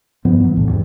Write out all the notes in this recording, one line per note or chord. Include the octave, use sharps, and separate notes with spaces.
G2 F3 B3
E3 F#3
B1 E2 A2 D3
E2 G2 E3